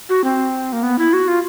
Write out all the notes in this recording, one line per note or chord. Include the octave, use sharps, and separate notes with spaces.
F#4
C4
A#3
B3
E4
F#4
F4